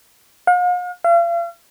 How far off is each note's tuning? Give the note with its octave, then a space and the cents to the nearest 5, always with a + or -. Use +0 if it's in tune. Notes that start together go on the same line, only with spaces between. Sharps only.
F5 +45
F5 -40